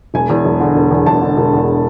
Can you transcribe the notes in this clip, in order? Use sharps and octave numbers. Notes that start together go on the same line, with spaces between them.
E1 G#5
E2
E1
D3
E1
E2
E1 A5
D3
E1
E2